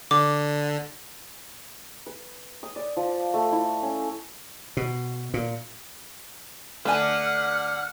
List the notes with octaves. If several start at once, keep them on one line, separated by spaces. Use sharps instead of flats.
D3 D6
B4
D#6
D5
F3
A3
E4
C#4
B2
A#2
D3 A3 D4 B4 F#5 G#5 F6